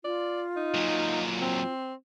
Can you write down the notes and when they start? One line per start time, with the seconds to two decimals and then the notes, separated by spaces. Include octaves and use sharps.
0.04 F4 D5
0.56 D#4
0.74 A#2 F#3
1.41 C4